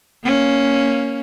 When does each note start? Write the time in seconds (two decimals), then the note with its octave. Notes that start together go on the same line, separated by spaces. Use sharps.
0.23 A#3 C#4